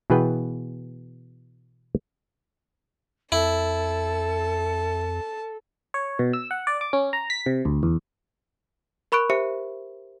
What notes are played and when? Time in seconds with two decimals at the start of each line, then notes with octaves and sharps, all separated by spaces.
0.10 B2 E3 B3 G#4 B4 G5
3.32 F2 E4 A4 A5
5.94 C#5
6.19 B2
6.33 E6
6.51 F#5
6.67 D5
6.81 D6
6.93 C#4
7.13 A#5
7.30 B6
7.46 C3
7.65 D2
7.83 E2
9.12 A#4 B5 C#6 F#6 D7
9.30 G4 C5 E5 C#7